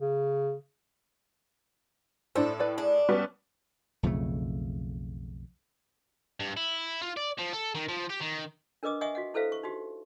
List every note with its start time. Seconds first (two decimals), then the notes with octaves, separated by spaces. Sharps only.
0.01 C#3
2.35 A2 D4 A4 C5
2.60 B4 D5 G5
2.78 D4 G#4
3.09 G3 B3 C#4
4.03 B1 F2 C#3 A3
6.40 G2
6.57 E4
7.01 F4
7.17 D5
7.38 F3
7.53 A4
7.75 D#3
7.89 F3
8.10 G4
8.21 D#3
8.83 D4 A#4 B4 D#5 D6 D#6
9.01 D#5 E5 F#5 G#5 C#6 D#6
9.15 F#4 D#5 F#5
9.34 E4 A4 B4 C5 E5 F5
9.52 C#6
9.63 D#4 F#4 G4